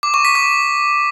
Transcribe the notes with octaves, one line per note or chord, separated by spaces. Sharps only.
D6
C#6
B6
D6